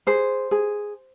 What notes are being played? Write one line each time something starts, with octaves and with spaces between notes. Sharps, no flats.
G#4 C5
G#4